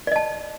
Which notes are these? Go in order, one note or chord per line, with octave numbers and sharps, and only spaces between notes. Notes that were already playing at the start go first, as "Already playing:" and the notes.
D5 D#5 A5